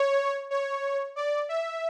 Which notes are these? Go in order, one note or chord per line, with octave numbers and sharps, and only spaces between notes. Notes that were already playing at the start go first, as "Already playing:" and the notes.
Already playing: C#5
C#5
D5
E5